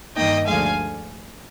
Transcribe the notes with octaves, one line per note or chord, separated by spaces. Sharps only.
G2 D#3 A#3 D#4 D#5 G5
D2 D3 F3 G#3 F5 G#5